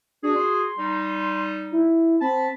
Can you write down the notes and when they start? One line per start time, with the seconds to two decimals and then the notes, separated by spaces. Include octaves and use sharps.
0.23 D4 F#4 G#4
0.36 C6
0.78 G3 D#4
1.72 E4
2.21 C4 A5 B5